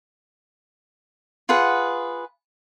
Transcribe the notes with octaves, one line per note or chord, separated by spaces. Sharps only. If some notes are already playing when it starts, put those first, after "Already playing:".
F4 G#4 B4 F#5